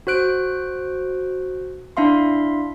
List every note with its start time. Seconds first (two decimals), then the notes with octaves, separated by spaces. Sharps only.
0.07 F#4 C5 F#6 D7
1.97 D4 E4 E5 F5 C6